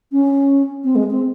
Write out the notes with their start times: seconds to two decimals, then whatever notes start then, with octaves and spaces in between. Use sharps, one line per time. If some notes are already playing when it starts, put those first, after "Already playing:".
0.12 C#4
0.84 C4
0.95 G#3
1.11 C4